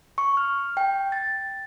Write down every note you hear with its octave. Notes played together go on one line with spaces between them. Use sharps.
C#6
F6
G5
A6